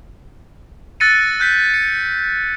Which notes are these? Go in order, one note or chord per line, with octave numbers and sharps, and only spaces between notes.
E6 F#6 A6 A#6 C#7 D#7
F#6 G6 B6
C#7